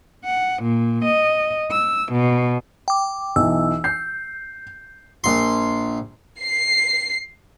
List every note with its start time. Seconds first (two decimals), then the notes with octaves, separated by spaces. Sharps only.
0.23 F#5
0.62 A#2
1.04 D#5
1.71 E6
2.11 B2
2.88 G5 D6
3.36 B1 E3 E6
3.84 G6 C7
5.24 A#1 C6
6.39 C7